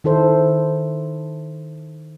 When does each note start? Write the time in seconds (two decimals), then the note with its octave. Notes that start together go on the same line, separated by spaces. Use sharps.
0.04 D#3 E4 A4 C5